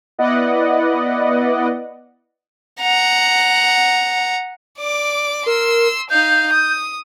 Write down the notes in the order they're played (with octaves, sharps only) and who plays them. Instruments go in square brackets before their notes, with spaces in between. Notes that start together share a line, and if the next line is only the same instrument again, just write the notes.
[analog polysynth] B3 E4 B4 D5 D#5 F#5
[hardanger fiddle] F#5 A#5
[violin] D5 D6
[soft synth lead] A#4 [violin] C6 E6
[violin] D#4 F5 [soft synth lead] G6
[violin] D#6